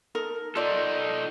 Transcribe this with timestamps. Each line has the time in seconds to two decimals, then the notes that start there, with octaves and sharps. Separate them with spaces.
0.15 D#4 A4 A#4
0.56 D#4 F4 A4 D5